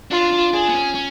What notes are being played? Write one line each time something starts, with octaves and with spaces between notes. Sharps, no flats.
D4 F4
D4
D4 G#4
B3
C#4
C#4